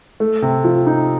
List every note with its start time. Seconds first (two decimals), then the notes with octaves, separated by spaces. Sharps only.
0.20 A3
0.42 C3
0.64 F3
0.87 D#4